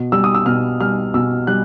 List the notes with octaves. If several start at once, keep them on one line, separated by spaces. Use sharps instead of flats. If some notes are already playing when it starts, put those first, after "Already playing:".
Already playing: B2
G3 E6
D#6
E6
B2 F6
G3 F6
B2 E6
G3 F#6